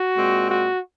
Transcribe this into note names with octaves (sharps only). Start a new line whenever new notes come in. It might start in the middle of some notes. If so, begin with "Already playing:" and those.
Already playing: F#4
A#2 G#3 C4
F#4